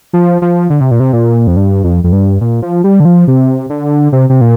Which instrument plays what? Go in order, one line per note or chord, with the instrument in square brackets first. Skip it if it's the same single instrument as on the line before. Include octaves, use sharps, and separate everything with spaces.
[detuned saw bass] F3
F3
D3
C3
A#2
C3
A#2
F2
G2
F2
F2
G2
A#2
F3
G3
D3
F3
C3
D3
C3
C3
A#2